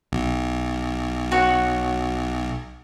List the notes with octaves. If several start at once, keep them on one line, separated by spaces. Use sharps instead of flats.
B1
F#4 C#5